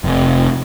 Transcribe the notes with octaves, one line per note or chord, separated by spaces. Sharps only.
F1